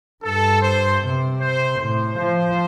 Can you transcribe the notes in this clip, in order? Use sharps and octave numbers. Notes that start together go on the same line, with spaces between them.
G2 A4
C5
C3
C5
A2 C5
F3